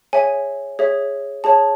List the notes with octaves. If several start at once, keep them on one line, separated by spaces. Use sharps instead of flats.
G#4 C#5 E5 G#5
G#4 C#5 E5
G#4 C#5 E5 A5